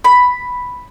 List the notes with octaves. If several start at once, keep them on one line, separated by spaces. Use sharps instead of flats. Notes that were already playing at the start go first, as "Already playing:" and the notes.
B5